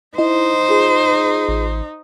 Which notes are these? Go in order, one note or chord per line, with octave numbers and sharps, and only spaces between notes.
D#4 E4 C5 D#5
F4 G#4
A1